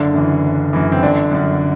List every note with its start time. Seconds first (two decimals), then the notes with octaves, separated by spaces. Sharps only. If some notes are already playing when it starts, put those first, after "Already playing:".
Already playing: F#1 D3 D4
0.14 F#2 E3
0.44 F#1
0.73 F#2 E3
0.92 C4
1.02 G1 D3 D4
1.32 F#2 D3